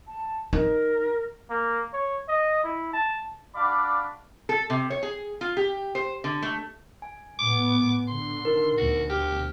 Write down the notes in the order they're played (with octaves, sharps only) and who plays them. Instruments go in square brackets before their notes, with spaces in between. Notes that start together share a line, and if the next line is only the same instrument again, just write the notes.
[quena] A5
[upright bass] D#4 [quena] A#4
[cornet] A#3
C#5
D#5
E4
A5
[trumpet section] D4 F#4 D5 F5 B5 D6
[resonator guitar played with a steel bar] A4
C3
C#5
G#4
F4
G4
C5
D3
A3
[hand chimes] G#5
[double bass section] A2 B3 [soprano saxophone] D6
[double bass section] D3 [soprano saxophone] C6
[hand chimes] D#4 A#4 B4
[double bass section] D2 B2 [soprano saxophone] F#4
[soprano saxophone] G4 [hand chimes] F6